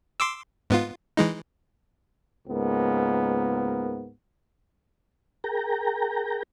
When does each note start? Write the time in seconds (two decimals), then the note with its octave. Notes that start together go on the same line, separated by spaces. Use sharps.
0.20 C6 D6 E6
0.70 G#2 B3 F4
1.17 E3 G#3 D#4
2.48 C#2 G#2 A#3 B3 A#4
5.44 G#4 A#4 G5 A#5